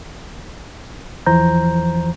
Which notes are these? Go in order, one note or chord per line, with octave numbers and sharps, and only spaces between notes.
E2 E3 F3 C5 A#5 G6